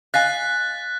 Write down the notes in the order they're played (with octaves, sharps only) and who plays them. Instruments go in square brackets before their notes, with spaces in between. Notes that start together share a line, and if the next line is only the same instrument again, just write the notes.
[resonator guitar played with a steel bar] D#5 F5 G#5 [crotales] F#6 A6 B6